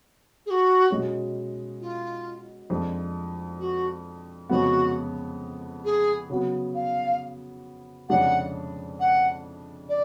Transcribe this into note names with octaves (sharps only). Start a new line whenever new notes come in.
G#4
F#4
B2 G#3 C#4
F4
F2 F3 G#3 D4
F#4
F2 C#3 G#3 B3 F#4
G#4
C#3 F#3 B3
F5
F2 C#3 G#3 D4 F#5
F#5
D5